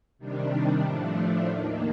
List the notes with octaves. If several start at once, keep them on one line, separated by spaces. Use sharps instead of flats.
C3 D#3 G3 D4
A2 F3 A3 D4
D#2 D#3 A#3